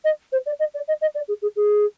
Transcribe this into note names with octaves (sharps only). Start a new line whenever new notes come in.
D#5
C5
D5
D#5
D5
D#5
D#5
D5
G#4
G#4
G#4